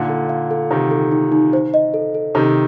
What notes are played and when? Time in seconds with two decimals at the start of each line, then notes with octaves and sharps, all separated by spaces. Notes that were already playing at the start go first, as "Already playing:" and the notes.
Already playing: A#2 D3 D#4
0.09 A4
0.29 F5
0.51 A4
0.70 C3 D#3 D#4
0.91 A4
1.12 D#4
1.32 D#4
1.53 C5
1.74 D#5
1.94 A4
2.15 A4
2.35 C3 D#3 A4